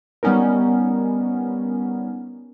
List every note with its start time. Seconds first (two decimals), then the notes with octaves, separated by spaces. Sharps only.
0.23 G3 B3 C#4 D#4 A#4